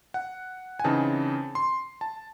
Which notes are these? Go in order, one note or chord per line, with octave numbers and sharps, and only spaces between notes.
F#5
G#5
C#3 E3 C4 D#4 A5
C6
A5